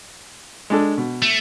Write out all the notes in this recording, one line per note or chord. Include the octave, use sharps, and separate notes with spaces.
G#3 D4 A4
B2
A3